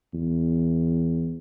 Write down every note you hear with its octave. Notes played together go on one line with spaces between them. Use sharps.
E2